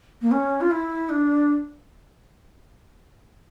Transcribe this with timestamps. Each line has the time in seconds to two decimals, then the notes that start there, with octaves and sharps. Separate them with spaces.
0.21 A#3
0.31 C#4
0.61 F4
0.71 E4
1.09 D4